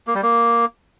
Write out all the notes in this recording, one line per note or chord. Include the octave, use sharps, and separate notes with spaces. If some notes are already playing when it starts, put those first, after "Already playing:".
A#3
G3
A#3